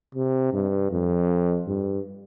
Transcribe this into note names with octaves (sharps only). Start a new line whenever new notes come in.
C3
G2
F2
G2